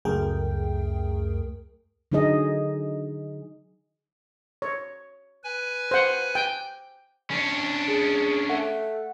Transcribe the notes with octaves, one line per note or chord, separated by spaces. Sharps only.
C#2 F#2 A3 G#4 A#4 G5
D3 F#3 D#4 G#4 D#5
C#5
B4 G#5
C5 F#5
G5
C#4 D4
G#4
A3 F#5